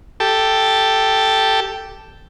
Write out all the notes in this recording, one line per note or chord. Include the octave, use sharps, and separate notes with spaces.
G4 A4